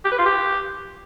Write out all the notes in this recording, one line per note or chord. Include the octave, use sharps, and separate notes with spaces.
G4
B4
F4
G4